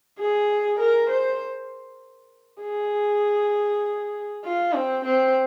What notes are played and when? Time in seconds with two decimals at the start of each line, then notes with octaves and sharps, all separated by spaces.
0.19 G#4
0.80 A#4
1.10 C5
2.62 G#4
4.45 F4
4.75 C4
5.05 C4